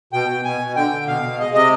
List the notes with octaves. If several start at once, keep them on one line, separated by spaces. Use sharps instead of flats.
B2 G5
B2
B2 G#5
B2
D3 G5
D3
B2 F5
B2
G#3 D#5
C3 D#5